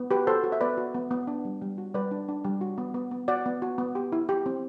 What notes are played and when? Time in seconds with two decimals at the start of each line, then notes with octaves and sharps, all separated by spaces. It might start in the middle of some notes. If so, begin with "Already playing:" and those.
Already playing: B3
0.11 F#4 G4 B4
0.27 F#4 A4 C5
0.44 F#4
0.52 E5
0.61 B3 B4 D5
0.77 F#4
0.94 B3
1.11 B3
1.27 D4
1.45 G3
1.62 G3
1.78 F#4
1.94 G3 B4 D5
2.11 D4
2.29 D4
2.44 G3
2.61 F#4
2.78 B3
2.94 B3
3.11 B3
3.28 F#4 D5 F#5
3.46 B3
3.62 F#4
3.78 B3
3.95 G4
4.12 E4
4.29 G4
4.46 C4